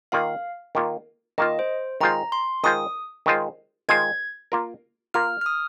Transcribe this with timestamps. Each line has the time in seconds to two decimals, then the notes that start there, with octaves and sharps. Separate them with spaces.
0.12 D#3 A#3 F4 F5
0.75 D#3 A#3 F4
1.38 D#3 A#3 F4 D#5
1.59 C5
2.01 D#3 G#3 F4 C5 A#5
2.32 C6
2.64 D#3 G#3 F4 C5 D#6
3.26 D#3 G#3 F4 C5
3.89 D#3 G#3 F4 C5 G#6
4.52 A#3 F4 A#4
5.14 A#3 F4 A#4 F6
5.41 F6
5.46 D#6